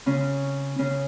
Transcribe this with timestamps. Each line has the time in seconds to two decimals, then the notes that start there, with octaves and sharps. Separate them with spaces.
0.06 C#3 C#4
0.79 C#3 C#4